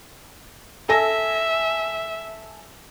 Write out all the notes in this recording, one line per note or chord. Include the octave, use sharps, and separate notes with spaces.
A4 E5 G#5 A#6